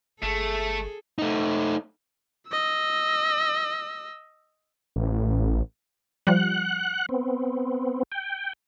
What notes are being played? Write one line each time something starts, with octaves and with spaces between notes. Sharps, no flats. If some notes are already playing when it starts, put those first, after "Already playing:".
G1 A3 G#4 A4
A3 D#4
D#5 E6
A1
F3 G3 F#5 F#6
B3 C4
G5